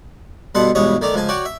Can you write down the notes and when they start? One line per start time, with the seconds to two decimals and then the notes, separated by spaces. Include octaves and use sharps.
0.55 G2 B2 B3 A4 F#5 C6
0.75 E2 G2 B2 G#3 C#5 D#6
1.01 D#3 A3 D5 A#5 D6
1.14 C#2 F3 G#5 A5
1.29 F#4 C#5 D5 G5
1.45 E5